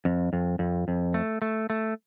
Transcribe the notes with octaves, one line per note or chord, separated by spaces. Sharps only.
F2
F2
F2
F2
A3
A3
A3